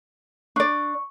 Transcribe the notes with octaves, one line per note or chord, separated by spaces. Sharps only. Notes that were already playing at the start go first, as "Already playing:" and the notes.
D4 D5 C#6